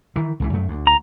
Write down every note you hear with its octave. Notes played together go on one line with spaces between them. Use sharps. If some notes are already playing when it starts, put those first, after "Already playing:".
D#3 E3
C#2 C#3 E3
F#2 A3
D2
A#5